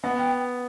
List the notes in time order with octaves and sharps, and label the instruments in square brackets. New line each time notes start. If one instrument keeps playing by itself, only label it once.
[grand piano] B3 [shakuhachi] F#5
[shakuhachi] G5